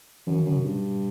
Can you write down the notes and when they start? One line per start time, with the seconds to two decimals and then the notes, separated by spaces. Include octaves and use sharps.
0.27 F#2 E3
0.36 D#3
0.46 F#2 D3
0.55 C3
0.64 G2 B2